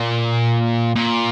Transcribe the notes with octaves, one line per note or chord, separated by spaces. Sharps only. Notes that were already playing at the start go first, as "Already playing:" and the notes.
Already playing: A#2
A#2